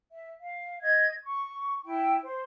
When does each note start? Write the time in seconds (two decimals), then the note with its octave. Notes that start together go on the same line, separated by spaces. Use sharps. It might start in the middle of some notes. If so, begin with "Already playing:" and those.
0.11 E5
0.42 F5
0.82 D#5 G#6
1.24 C#6
1.85 E4 G5
2.23 C5